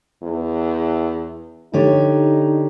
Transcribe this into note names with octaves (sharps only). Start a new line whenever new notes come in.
E2
D3 D#4 G4 C#5